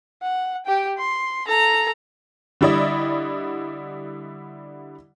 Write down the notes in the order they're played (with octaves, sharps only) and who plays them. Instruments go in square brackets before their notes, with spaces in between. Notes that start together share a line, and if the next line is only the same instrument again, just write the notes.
[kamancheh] F#5
G4 G5
C6
A4 A#5
[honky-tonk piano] D3 G3 E4 D5 D#5